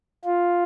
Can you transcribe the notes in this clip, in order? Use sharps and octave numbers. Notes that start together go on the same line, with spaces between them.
F4